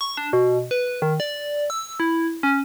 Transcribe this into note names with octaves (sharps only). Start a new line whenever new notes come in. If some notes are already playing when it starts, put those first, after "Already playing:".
C#6
D4
B2
B4
D#3
D5
E6
E4
C#4